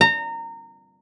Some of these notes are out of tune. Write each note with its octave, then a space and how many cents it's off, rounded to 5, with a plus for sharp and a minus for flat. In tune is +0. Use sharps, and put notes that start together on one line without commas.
A#5 -25